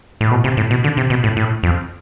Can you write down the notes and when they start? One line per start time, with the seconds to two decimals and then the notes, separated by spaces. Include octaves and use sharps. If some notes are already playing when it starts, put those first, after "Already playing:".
0.21 A2
0.31 B2
0.44 C3
0.57 A2
0.71 B2
0.84 D3
0.97 C3
1.10 B2
1.24 A2
1.37 A2
1.63 F2